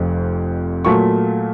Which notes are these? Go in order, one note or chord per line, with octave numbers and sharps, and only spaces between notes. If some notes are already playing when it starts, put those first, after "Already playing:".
Already playing: F1 F2
A#2 F#3 A3 C#6